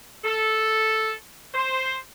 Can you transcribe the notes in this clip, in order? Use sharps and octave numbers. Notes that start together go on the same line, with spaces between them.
A4
C5